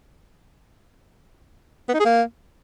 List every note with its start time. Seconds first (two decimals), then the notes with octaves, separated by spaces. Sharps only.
1.88 B3
1.94 D#4
2.00 G#4
2.05 A#3